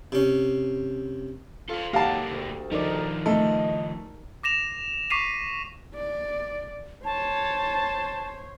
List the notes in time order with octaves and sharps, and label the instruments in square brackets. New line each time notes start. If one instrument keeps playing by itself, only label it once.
[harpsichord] C3 C#4
[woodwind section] F4 [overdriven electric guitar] A4 C5
[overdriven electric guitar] D3 A#3 [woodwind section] F#3 D#4 F#5 [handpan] G4 [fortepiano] F5 A5
[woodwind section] D2
[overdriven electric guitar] D#3 F3 [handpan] D#4 A#4 D5
[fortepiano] A3 [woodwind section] D#5
[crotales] D6 A#6 E7 F7
C#6 D6 B6 C7 D#7 F7
[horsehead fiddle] D5
[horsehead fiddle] C5 C#5 [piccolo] A5